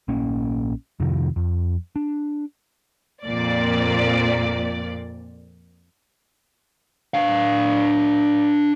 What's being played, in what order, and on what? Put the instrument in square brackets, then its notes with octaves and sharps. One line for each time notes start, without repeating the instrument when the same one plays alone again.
[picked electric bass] A#1 A#3 C#4
F2 C3 D#3 F3
F2
D4
[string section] F2 A#2 D5
[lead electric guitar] D4 F5